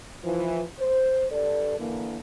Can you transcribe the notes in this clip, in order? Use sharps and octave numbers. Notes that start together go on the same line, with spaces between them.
E3 F3
C5
G2 A4 D5
D3 E3 A#3